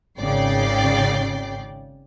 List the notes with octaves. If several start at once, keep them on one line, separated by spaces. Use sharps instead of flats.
G#1 C#3 D5 G5 C7